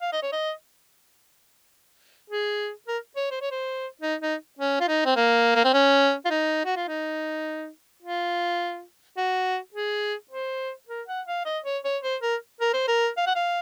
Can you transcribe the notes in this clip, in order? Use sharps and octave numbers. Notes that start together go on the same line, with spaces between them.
F5
D#5
C#5
D#5
G#4
A#4
C#5
C5
C#5
C5
D#4
D#4
C#4
F4
D#4
C4
A#3
A#3
C4
C#4
F4
D#4
F#4
F4
D#4
F4
F#4
G#4
C5
A#4
F#5
F5
D#5
C#5
C#5
C5
A#4
A#4
C5
A#4
F5
F#5
F5